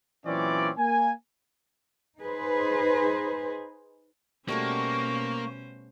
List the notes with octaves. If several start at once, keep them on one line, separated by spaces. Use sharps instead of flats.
A#2 E3 F#3 C4 C#4 D5
A#3 G#5
D#4 G#4 B4 C5
B2 G3 A3 A#3 C#4 F#4 C5 C#6